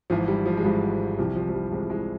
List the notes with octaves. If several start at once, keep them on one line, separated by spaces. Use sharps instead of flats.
G#1 G#2 E3 F3
G3
F3
G#3
G#1 G#2 E3 G3
C2 C3 E3 F3
F3
F3
G3
C2 C3 E3 G#3
G#3